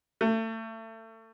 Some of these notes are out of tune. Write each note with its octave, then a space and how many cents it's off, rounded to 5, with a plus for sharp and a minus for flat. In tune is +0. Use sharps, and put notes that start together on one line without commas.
A3 +30